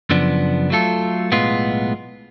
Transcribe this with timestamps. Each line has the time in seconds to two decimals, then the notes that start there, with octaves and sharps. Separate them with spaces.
0.10 F#2 C#3 F3 B3 D4
0.70 F#3 A3 F4 A4
1.31 B1 A2 G#3 B3 F4